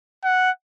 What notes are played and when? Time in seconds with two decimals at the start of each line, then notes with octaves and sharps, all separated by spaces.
0.24 F#5